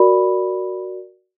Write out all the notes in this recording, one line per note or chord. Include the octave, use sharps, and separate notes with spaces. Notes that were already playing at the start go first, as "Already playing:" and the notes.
Already playing: F#4 A#4 D5 B5